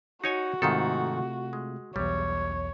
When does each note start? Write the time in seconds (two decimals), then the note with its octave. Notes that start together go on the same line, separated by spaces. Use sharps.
0.24 D#4 F#4 C#5 G#5
0.62 G#2 C3 D#3 A3 F4 A4
1.53 G#3
1.96 B1 E2 G3 C#5